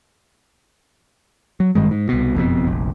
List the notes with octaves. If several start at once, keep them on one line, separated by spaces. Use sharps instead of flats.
F#3
G#1 G2 D#3 G#3
G#2
C2 B2
F#1 F2 G#2 B2
F1 A#1